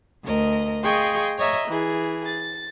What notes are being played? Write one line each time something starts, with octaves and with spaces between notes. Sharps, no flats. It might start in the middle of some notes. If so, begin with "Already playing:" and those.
D2 A#4 D#5
G#4 D#5 F5 G5 C6 C#6
C#5 D#5 E5 A#5
E3 G#4
A6